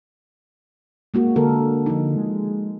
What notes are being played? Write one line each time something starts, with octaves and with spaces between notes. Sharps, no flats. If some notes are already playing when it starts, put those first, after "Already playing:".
G#3 A#3 F#4
D3 A4 A#4
F3 D#4
G#3